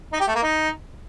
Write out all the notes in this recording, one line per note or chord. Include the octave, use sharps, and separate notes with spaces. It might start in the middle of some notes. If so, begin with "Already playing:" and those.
D#4
G4
A3
A#3
D#4